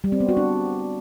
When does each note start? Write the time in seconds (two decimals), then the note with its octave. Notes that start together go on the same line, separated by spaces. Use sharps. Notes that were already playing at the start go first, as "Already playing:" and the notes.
0.04 G3
0.12 C4
0.20 B3
0.29 F#4
0.37 D4